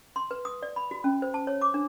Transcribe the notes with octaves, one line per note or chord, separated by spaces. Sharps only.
C6
B4
D#6
D5
B5
F#4
C#4
C5
A5
C#5
D6
D4